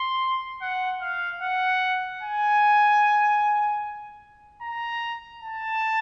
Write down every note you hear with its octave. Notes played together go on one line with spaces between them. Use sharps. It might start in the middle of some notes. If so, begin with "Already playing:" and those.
Already playing: C6
F#5
F5
F#5
G#5
A#5
A5